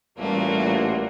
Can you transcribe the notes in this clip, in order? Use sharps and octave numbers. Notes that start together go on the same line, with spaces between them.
A1 A#2 G3 A3 A#3 F#4